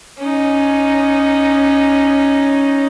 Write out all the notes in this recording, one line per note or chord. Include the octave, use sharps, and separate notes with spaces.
C#4 D#4